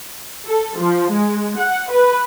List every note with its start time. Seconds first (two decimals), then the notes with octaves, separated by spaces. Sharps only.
0.47 A4
0.78 F3
1.11 G#3
1.57 F#5
1.90 B4